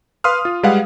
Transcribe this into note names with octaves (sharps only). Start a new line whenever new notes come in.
B4 F5 C6 D#6 F6
F4
G3 G#3 G#4 B4 F5 F#5